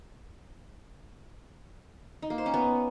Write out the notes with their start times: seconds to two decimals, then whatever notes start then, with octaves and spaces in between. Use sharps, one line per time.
2.22 D#4
2.30 A#3
2.38 C5
2.46 C#4
2.54 B3